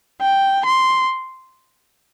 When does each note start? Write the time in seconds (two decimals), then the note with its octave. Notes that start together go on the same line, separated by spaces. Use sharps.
0.21 G5
0.66 C6